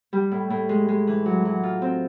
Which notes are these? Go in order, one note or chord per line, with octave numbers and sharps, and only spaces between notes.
G3
A2
A2
G#3
G#3
E3
F#3
F#3
F4
C4